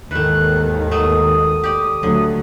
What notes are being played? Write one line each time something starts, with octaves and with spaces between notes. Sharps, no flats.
D#2 G#2 D#3 E3 A3 F#6
F#3 A3 D#6
G4 D5
D2 D3 F#3 A3